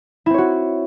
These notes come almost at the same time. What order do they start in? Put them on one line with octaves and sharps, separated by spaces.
E4 C4 C#5 F#4